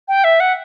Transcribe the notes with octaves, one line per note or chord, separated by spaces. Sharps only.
G5
E5
F#5